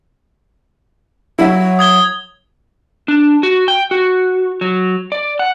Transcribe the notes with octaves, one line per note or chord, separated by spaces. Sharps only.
F#3 E4 E5
D#6 G#6 G7
D4
F#4
G5
F#4
F#3
D5
F#5